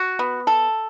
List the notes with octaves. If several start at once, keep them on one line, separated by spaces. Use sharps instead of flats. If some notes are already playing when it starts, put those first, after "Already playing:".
Already playing: F#4
B3
A4